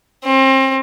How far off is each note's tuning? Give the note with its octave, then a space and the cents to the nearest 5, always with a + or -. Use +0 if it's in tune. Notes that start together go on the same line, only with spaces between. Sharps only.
C4 +35